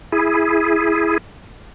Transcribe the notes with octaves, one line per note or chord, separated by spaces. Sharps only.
E4 G#4